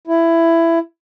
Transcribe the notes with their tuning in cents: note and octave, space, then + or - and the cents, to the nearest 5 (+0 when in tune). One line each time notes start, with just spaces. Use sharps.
E4 +15